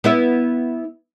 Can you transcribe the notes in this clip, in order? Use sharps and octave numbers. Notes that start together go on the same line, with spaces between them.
B3 E4 E5